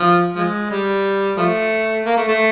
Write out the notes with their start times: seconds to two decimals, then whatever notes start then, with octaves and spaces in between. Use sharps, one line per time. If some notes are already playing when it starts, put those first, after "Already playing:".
Already playing: F3
0.35 F3 G#3
0.70 G3
1.37 F3 A3
2.06 A#3
2.17 A3
2.28 A3